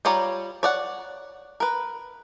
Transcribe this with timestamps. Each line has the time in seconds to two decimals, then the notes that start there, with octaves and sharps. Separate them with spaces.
0.05 G3 F4 C#5 D5 A#5
0.63 C#5 D5 F#5
1.60 A#4 B4